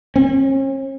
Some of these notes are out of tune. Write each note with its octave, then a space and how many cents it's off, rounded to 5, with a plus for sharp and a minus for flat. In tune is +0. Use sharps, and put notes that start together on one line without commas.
C#4 -45